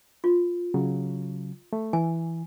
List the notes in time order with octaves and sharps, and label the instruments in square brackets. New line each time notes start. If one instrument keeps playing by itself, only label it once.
[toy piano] F4
[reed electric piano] C#3 F#3
A3
[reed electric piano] E3 [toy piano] G#5